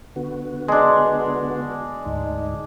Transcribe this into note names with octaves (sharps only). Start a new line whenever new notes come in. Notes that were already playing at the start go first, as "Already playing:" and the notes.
D3 B3 F#4
G#3 D4
D2 G#2 D#4